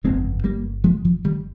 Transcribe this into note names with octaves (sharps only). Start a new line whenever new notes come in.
G1 F2 C#3 G#3 C4
G3 A#3
F3 G#3
F3
D#3 G3